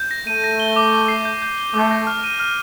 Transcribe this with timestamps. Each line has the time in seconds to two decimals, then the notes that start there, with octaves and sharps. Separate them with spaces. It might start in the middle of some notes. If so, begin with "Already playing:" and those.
Already playing: G6
0.11 A#6
0.27 A3 D#7
0.44 A#6
0.60 G7
0.76 D6
0.93 G7
1.08 C7
1.25 G6
1.42 G6
1.58 G7
1.74 A3 D6
1.91 A#6
2.07 F6
2.24 D#7
2.40 F6